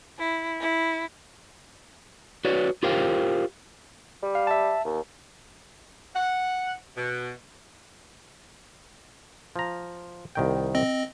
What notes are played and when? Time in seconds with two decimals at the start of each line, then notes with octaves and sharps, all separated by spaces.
0.18 E4
0.60 E4
2.45 F#4 B4 C#5 D5
2.83 F4 G4 A#4 C5 F5 G5
4.23 G3
4.35 F5
4.47 E5 A5
4.84 D#2
6.16 F#5
6.97 B2
9.56 F3 A#5
10.35 C2 D#3 G5
10.75 C4 D#5